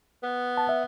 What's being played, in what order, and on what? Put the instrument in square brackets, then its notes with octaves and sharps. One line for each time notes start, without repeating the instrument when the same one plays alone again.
[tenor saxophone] B3
[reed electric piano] A5
E5